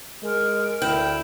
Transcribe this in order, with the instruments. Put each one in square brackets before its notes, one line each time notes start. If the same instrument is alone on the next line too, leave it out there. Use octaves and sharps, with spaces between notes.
[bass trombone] G#3 [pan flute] A#4
[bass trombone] D2 [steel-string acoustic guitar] E4 [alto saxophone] G5